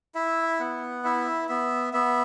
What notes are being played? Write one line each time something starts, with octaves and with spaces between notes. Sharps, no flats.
E4 E5
B3 F#5
E4 E5
B3 E5
B3 E5